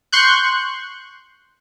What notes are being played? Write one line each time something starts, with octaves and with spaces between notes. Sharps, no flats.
C6 C#6 F#6 G6